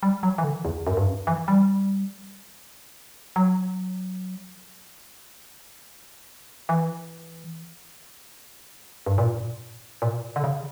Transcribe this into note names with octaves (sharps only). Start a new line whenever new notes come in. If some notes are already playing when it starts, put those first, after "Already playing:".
G3
F#3
E3
D3
E2
F#2
G2
F#2
E3
G3
F#3
E3
G2
A#2
A#2
D3
C#3